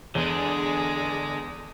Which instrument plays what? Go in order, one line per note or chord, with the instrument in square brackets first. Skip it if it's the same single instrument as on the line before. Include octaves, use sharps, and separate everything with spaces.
[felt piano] E2 [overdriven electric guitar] D3 D4 [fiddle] G#3 [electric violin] G#4